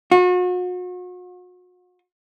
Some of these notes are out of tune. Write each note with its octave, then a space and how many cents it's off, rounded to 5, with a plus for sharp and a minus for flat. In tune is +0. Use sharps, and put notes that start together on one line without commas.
F#4 -40